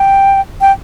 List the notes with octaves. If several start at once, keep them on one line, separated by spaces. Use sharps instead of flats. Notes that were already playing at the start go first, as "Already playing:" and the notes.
Already playing: G5
G5